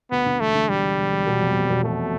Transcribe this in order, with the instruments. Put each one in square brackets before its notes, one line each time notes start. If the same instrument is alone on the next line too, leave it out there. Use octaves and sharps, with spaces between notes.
[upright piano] D2 [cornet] B3
[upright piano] D3
[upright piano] E1 [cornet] A3
[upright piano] D3
[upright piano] E1 [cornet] G3
[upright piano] E1
E1
E1
B2
F1
F1
B2
[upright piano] B2 [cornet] A3